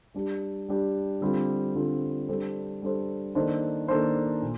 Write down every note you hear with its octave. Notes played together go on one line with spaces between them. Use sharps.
G3 D4 G4
G3 D4 G4
D3 G3 C4 F4
D3 G3 C4 F4
G3 D4 A4 C5
G3 D4 A4 C5
D#3 A#3 D4 A4 C5
D#3 A#3 D4 A4 C5
A#2